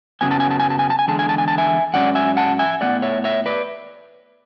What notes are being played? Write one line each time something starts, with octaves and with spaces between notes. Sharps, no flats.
F#2 C#3 F#3 B3 G#5
A5
G#5
A5
G#5
A5
G#5
A5
G#5
E2 D3 G#3 A5
G#5
A5
G#5
A5
E5 G#5
G#2 F#3 C#4 D5 F#5
E5 G#5
F#5 A5
E5 G#5
A2 G#3 B3 D5 F#5
C#5 E5
C#5 E5
B4 D5